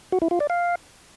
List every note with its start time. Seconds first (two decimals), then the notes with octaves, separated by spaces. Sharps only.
0.12 F#4
0.22 E4
0.31 F4
0.40 D5
0.50 F5